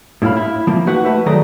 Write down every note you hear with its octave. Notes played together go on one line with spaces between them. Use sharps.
A2 E4 E5 F5 B5
E4
F3 A#3
D#4 F#4 B4 F#5
A3 B4 E5
D#3 F#3 A3 G#4 D5 A#5